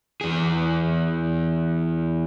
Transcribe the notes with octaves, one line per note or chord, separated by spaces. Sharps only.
E2 G#4